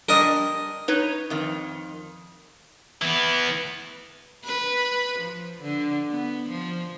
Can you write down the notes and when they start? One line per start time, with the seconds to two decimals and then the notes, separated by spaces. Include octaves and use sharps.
0.09 G3 D4 A#4 D#5
0.88 D#4 B4 C#5
1.30 F2 D#3
3.02 E3 B3
4.45 B4
5.20 F3
5.62 D3
6.10 B3
6.50 F3